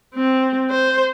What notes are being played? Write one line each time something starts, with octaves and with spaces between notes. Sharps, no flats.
C4
C5